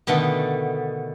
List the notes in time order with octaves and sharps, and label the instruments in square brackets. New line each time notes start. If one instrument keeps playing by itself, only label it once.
[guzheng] B2 D3 D#3 A3 B3